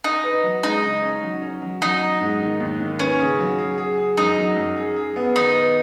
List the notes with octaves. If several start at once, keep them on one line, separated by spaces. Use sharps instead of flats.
D#4 D#5
B4
F#3
G#3 D#4
C#3
C#4
F#3
C#4
F#3
F#3 D#4
F#3
G#2
D#3
D#2
D#3
C#4 B4
C#3
F#3
G#4
G#4
G#4
F#2 D#4
F#3
F#2
G#4
G#4
B3
D#3 D#4
B4